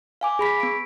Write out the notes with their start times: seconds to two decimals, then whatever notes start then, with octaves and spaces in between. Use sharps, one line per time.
0.21 F5 G#5 D6
0.39 G#4 B5 B6
0.60 B3 D7